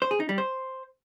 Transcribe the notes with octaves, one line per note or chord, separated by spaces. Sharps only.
C5
G#4
D#4
G3
C5